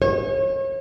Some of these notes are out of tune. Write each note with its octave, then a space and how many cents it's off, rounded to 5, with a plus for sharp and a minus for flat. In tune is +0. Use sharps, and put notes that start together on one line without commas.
C#5 -35